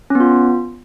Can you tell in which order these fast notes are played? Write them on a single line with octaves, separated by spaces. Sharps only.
C#4 B3 F4